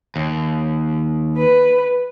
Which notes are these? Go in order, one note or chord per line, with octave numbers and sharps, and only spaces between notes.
D#2
B4